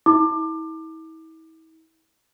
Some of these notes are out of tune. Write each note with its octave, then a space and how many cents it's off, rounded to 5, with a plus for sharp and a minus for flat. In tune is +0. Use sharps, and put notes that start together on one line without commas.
E4 -40 D6 +25